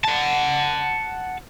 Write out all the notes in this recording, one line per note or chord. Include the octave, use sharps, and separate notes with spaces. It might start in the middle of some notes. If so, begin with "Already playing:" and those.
F#5 A5